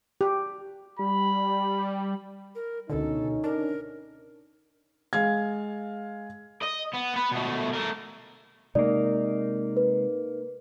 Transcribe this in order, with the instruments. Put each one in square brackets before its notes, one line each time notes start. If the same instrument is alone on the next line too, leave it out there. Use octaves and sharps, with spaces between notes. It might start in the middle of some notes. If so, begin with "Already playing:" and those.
[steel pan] G4
[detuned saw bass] G3 [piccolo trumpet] B5
[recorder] A#4
[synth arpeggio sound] C#2 B2 D3 [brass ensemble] C#4 D#4 [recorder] A4
[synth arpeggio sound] D4 [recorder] A#4
[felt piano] G#3 F5 G#6
[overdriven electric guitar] D#5
B3
B3 B4
B2 A3
A3 A#4
[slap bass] C3 G#3 [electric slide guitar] A#3 D#4 [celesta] D5
[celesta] B4